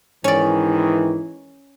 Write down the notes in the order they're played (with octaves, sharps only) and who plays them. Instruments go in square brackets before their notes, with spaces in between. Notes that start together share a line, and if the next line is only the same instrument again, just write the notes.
[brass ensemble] G#2 D#3 E3 [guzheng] C#4 D5